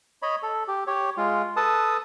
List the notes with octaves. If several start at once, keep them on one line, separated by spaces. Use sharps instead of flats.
C#5 D#5 B5
A4
G4
G4 C#5
G#3 F4
A4 B4 A5 D#6